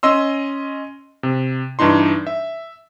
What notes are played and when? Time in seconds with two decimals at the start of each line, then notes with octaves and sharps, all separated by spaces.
0.03 C#4 D#5 C6 E6
1.23 C3
1.79 G2 E3 D4 D#4 C6
2.27 E5